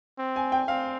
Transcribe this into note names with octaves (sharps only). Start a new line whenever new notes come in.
C4
G#5
G5
C4 F5